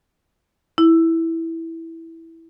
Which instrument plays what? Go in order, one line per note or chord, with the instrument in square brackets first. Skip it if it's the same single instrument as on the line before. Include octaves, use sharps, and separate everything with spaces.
[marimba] E4